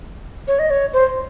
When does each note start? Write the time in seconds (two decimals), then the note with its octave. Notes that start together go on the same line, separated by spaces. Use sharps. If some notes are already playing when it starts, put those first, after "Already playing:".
0.48 C#5
0.59 D#5
0.70 C#5
0.93 C5